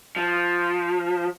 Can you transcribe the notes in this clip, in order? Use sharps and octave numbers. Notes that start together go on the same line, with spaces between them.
F3